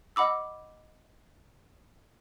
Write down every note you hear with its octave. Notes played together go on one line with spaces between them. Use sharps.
D#5 F#5 B5 D6 E6